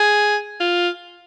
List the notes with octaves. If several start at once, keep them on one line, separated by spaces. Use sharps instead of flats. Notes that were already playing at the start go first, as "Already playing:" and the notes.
Already playing: G#4
F4